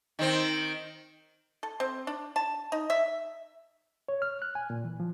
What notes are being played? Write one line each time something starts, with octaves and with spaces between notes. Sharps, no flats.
D#3 C4
A4
C4
D4
A5
D#4
E5
C#5
F6
F#6
G#5
A#2
E3
F3